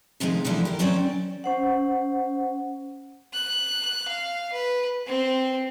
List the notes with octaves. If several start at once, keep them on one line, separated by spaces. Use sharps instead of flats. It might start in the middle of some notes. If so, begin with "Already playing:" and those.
D#2 C3 F3 G#3 D#4
B2 D3 E3 F3 G3 E4
G4 A#4
F#3 C4 C#4 C5 D5
C#4 C5 F#5
F#6
F5
B4
C4